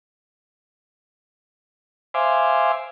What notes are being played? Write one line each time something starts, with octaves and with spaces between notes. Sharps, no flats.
C5 E5 F5 G#5 D6